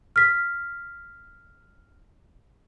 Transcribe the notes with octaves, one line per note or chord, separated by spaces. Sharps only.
F6 B6